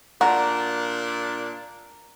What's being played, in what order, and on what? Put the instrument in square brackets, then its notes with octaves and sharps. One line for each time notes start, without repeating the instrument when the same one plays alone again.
[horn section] A#2 D4 [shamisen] F#4 [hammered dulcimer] A#5